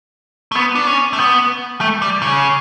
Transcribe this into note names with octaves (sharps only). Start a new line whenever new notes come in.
A3
B3
D4
C#4
A3
B3
A3
G3
C#3